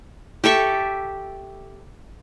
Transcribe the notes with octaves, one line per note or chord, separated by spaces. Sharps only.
G4 A4 E5 C#6